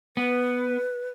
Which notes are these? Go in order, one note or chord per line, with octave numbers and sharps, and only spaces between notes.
B3 B4